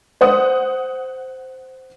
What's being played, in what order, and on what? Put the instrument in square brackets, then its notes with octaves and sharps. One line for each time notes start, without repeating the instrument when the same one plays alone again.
[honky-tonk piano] C5 F#5 D#6